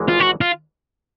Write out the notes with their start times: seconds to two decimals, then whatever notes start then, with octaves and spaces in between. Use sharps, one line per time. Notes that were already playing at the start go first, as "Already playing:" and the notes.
Already playing: G#1 G#2 E3 G#3
0.09 F4
0.20 F#4
0.41 F4